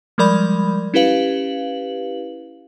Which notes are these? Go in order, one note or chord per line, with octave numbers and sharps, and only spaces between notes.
F3 G3 G#3 A#4 D5 B5
C#4 E4 G4 B4 F5 F#7